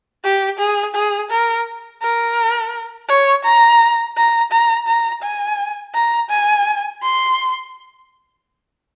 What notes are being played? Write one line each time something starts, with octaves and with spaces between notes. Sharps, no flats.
G4
G#4
G#4
A#4
A#4
C#5
A#5
A#5
A#5
A#5
G#5
A#5
G#5
C6